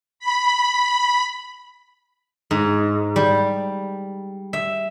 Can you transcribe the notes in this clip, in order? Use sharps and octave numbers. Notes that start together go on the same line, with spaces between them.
B5
G#2
G3
E5